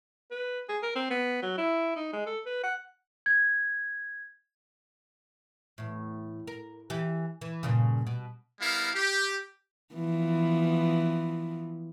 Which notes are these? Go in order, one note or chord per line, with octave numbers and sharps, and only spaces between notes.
B4
G#4
A#4
C4
B3
F#3
E4
D#4
G#3
A4
B4
F#5
G#6
E2 A2
A#4
E3 G4
E3
G2 A#2 C#3
B2
G3 B3 E4 A#4 F5
G4
E3 F3 B3